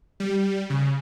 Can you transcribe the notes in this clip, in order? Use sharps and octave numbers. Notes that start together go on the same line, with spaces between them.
G3
C#3